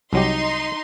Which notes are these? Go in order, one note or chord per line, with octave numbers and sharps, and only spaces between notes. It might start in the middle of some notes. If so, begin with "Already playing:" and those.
C2 F#3 D#4 G4 C6